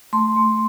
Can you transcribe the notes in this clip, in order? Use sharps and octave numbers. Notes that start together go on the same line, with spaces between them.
A3 C6
A3